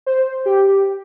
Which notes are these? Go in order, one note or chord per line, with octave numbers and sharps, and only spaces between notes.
C5
G4